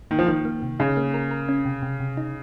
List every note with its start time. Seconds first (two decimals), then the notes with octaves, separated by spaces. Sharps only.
0.11 D#3 A#3
0.19 F3
0.27 D#3 A#3
0.45 A#3
0.63 C3
0.79 C#3 D#4
0.97 A#3
1.14 A#4
1.31 A#4
1.49 C#4
1.66 C3
1.83 C3
2.00 C3
2.17 D#4